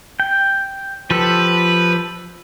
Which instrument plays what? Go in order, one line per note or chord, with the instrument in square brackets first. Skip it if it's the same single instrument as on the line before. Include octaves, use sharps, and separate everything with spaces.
[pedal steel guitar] G5
[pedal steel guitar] F3 G4 A4 [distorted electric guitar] B4